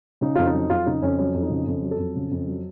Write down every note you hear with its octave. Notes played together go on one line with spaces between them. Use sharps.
C#3 D#4
F2 F4
D#4
F#3
F2 F4
C#3 D#4
F2 C#4
F#3 C#4
F2
D#4
C#3
F2
F#3
A4
F2
C#3
F2
F#3